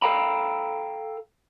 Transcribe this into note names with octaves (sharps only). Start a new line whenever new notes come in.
A4 F5 G5 A#5 B5